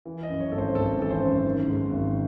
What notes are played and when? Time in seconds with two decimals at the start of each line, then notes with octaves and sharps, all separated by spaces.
0.05 E3
0.23 D#5
0.29 F#2
0.40 C#5
0.52 G#1 A4
0.58 C5
0.75 G#1 A4
0.98 E3 A4
1.10 C5
1.22 F#2
1.45 D#3
1.68 G#2
1.91 G#1